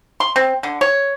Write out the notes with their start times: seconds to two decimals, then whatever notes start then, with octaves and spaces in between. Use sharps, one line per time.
0.20 C6
0.36 C4
0.63 D3
0.81 C#5